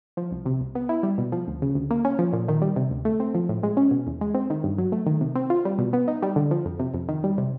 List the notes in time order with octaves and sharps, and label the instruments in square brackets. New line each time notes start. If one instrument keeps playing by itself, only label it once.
[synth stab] F3
C2
C3
C2
B3
E4
G3
B2
F3
D2
C#3
D2
A#3
C#4
F3
A#2
D#3
G3
C3
D2
A3
C4
F3
A2
G#3
C#4
B2
E2
G#3
C4
D#3
G2
F#3
A3
D#3
C3
C4
F4
G3
B2
B3
D#4
G3
D3
F3
F2
C3
F2
D#3
G3
C3